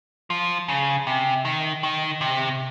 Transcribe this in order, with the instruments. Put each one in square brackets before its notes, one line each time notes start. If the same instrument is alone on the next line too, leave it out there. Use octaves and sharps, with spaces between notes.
[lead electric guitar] F3
C#3
C3
D#3
D#3
C3